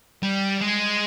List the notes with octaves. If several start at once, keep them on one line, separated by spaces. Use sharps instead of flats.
G3
G#3